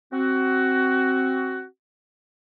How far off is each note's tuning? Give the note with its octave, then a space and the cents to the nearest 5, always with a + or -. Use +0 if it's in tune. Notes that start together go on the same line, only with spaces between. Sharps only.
C4 +10 F#4 +15